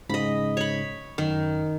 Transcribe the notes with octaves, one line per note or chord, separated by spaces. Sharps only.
G#2 C#3 D#5 B5
C#5 B5
F#2 D#3